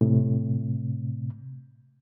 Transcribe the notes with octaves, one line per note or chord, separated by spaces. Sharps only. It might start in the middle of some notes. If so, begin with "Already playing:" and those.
A2 C3